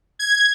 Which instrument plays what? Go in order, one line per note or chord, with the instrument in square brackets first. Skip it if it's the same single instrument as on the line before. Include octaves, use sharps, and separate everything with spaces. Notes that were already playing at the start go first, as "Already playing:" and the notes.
[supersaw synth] G#6